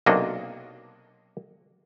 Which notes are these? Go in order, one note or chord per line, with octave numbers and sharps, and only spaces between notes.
B1 C3 A#3 D4 F#4 D#5